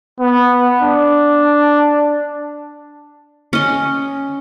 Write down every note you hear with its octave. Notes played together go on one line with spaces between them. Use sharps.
B3
D4
C#4 D#5